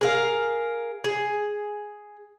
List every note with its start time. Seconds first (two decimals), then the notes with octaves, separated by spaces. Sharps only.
0.01 G#4 A#4 F5
1.04 G#4